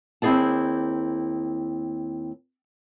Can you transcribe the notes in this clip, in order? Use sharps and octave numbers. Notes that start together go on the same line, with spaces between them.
D#2 C4 E4 G#4 D5 A5